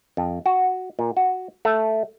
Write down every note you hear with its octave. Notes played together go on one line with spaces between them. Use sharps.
F2
F#4
A#2
F#4
A3